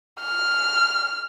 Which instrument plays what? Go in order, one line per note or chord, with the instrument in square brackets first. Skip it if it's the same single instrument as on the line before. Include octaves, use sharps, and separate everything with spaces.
[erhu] F6